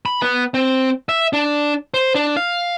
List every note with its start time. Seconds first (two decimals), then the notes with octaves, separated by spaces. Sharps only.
0.06 B5
0.22 B3
0.54 C4
1.09 E5
1.33 D4
1.94 C5
2.15 D4
2.37 F5